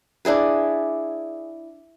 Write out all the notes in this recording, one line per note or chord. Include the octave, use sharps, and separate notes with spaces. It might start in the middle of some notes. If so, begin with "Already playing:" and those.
D4 E4 G#4 B4